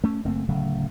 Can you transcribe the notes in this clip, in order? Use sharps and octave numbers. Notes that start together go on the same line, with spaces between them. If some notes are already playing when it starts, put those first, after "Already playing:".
A3 C#4
F#1 A3 A#3 C4
D1 C#3 F#3 A3